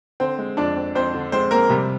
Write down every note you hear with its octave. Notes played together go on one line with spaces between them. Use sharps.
D3 C4 C5
G#3
F2 D4 D5
C4
F2 C4 C5
D3
G#3 C4 C5
A#3 C4 A#4
C3 G3 G4